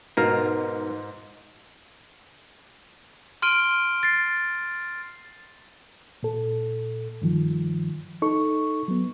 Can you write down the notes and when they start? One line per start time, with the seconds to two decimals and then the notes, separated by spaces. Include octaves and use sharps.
0.17 G#2 B2 A#4 F5
3.42 C6 F6 D7 D#7 G7
4.03 A6 C7
6.23 A#2 A4
7.22 G2 D#3 F3
8.22 D#4 A4 C#6
8.88 F#3 B3